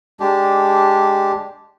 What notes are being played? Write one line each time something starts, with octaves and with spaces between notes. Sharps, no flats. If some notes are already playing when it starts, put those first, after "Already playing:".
G#3 D4 G4